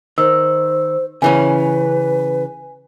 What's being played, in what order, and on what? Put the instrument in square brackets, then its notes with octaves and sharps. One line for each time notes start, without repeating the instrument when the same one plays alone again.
[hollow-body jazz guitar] D#3 [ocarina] C5 [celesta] E6
[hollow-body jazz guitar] C#3 E3 C#4 [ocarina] B4 [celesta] G#5